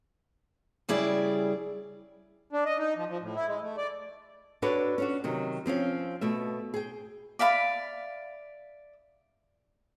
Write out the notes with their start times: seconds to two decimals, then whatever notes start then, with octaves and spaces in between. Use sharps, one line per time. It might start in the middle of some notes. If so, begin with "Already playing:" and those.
0.89 C#3 G3 E4 G#4 D5
2.53 D4
2.66 D#5
2.78 D#4
2.96 F3
3.09 F3
3.21 A2
3.36 E4
3.47 G#3
3.62 A3
3.77 D5
4.62 D4 F#4 A4 B4 C#5 D5
4.98 C#4 D4 F#4
5.24 C3 D#3 F#3
5.66 F3 C4 C#4 F5
6.21 B2 A3 E5
6.74 G#4 G5
7.39 D5 E5 F5 B5